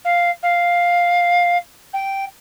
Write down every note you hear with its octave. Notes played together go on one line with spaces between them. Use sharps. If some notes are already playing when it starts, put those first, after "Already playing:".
F5
F5
G5